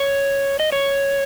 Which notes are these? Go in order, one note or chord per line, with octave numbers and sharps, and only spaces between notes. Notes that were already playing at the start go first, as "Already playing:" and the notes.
Already playing: C#5
D#5
C#5